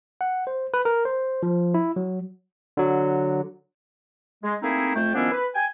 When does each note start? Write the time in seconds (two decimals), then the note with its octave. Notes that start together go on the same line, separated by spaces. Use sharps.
0.21 F#5
0.47 C5
0.74 B4
0.85 A#4
1.05 C5
1.43 F3
1.74 E4
1.96 F#3
2.77 D3 F#3
4.43 G#3
4.63 A3 A#3 C4 D#4 E4 G#4
4.95 F2 A3 G5
5.15 D#3 F3 B3 C#4 D4 E4
5.32 B4
5.55 G5 G#5